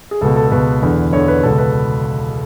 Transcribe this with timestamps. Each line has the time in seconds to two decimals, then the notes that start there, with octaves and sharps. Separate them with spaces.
0.11 G#4
0.21 C#2 B2 A4
0.36 A4
0.47 A4
0.52 C#2 B2 B4
0.82 E2 D3
1.13 E2 D3 C#5
1.28 B4
1.43 C#2 B2 A4
1.58 B4